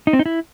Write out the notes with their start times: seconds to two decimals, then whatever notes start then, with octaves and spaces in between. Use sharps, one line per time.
0.07 D#4
0.13 C4
0.19 D#4
0.26 E4